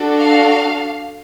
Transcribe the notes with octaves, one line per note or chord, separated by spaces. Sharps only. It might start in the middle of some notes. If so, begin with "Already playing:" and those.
Already playing: D4 F#4 A4
F5